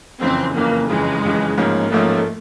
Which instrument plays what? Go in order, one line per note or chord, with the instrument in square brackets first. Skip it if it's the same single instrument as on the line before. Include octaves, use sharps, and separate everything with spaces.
[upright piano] F#1 F2 C#3 E3 [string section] C4
[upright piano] F#1 F2 C#3 E3 [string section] A#3
[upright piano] F#1 F2 C#3 E3 [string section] G#3
[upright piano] F#1 F2 C#3 E3
A1 G#2 F3 A#3 C#4
[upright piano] A1 G#2 F3 A#3 C#4 [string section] A3